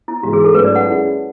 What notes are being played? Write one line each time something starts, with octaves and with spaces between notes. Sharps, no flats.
E4
G#2 E3 G#3 F#4
G#4
A4
G#2 F#3 A3 C#4 B4
D5
F#5
G#3 C#4 E4 A4